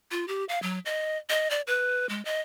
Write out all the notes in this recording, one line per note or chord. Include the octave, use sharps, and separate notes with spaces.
F4
G4
F5
F#3
D#5
D#5
D5
B4
G#3
D#5